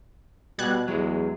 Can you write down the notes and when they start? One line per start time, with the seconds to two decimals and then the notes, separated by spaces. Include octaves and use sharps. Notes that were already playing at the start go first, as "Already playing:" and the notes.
0.59 B2 G3 F#6 G#6
0.88 E2 F#3 G#3